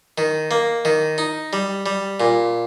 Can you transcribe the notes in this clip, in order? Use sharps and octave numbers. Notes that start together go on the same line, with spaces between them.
D#3
A#3
D#3
D#4
G3
G3
A#2